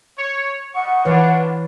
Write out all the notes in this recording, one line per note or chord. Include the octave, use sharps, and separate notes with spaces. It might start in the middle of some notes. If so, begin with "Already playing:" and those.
C#5
G3 D#5 F#5 C#6
E3 D4 F4 B4 C#5